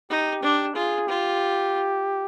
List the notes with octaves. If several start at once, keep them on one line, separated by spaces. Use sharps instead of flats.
D#4 G4
D4
F4 G#4
F4 G4